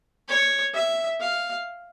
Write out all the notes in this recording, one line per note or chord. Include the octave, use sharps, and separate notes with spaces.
C#5
E5
F5